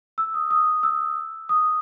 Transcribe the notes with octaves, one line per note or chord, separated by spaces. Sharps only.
E6
D#6
D#6
E6
D#6